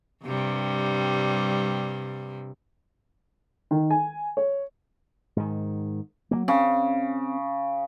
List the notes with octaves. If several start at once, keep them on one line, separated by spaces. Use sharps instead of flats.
G2 C3 G3
D#3
G#5
C#5
G#2 D#3
F#3 G3 A#3
C#3 C4